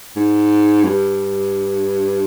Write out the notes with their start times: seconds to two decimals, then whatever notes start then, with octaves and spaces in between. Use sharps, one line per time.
0.16 G#2
0.84 F#2
0.89 G2